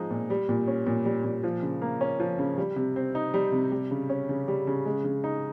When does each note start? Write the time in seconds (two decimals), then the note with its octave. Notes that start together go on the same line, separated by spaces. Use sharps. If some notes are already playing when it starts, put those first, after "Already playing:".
Already playing: F3 G#3 D#4
0.11 A#2
0.30 G3
0.49 A#2
0.67 C#4
0.86 A#2
1.05 G3
1.24 A#2
1.44 F3
1.62 C#3
1.82 A#3
2.01 C#4
2.20 F3
2.39 C#3
2.58 G3
2.76 C3
2.96 C4
3.15 D#4
3.34 G3
3.52 C3
3.72 G3
3.91 C#3
4.09 C#4
4.29 C#3
4.48 G3
4.67 C#3
4.86 G#3
5.04 C#3
5.24 D#4